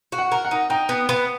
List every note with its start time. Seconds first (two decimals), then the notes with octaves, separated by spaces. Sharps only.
0.12 F#4
0.18 F#5
0.32 A#4
0.45 F#5
0.51 D#4
0.70 D#4 G5
0.89 B3
1.09 B3